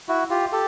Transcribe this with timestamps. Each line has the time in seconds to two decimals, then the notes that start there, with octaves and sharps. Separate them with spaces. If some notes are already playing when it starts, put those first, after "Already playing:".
0.09 E4 F#4
0.30 F4 G4
0.52 G4 A4